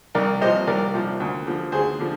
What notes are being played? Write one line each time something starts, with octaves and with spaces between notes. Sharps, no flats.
C2 A#4 D5
C3 F3 C5 D#5
C2 A#4 D5
C3 F3
D2
D3 F3
D2 G#4 C5
D3 F3